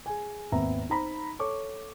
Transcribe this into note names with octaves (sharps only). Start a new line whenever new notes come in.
G#4 G#5
G#1 D#2 B3 C4 E5 A#5
D#4 C5 A#5 B5
A4 C#5 C#6 D6